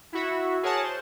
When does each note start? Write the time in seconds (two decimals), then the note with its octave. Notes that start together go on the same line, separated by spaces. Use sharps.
0.13 E4 F#4 E5
0.63 G#4 A#4 C#5 F#5 A5
0.83 C5